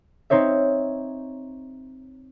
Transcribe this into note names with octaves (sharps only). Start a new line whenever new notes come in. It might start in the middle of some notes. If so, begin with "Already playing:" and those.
C4 D#4 C5 C#5 E5